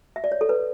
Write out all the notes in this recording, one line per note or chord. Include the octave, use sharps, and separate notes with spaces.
E5
D5
C#5
A4
B4